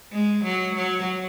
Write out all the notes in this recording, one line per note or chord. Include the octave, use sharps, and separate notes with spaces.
G#3
F#3
F#3